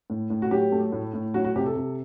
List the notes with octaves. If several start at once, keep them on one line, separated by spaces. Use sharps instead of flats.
A2
A2
F#4
F#3 G4
A3
A2
A2
F#3 F#4
F#4
C3 G4
A4
C3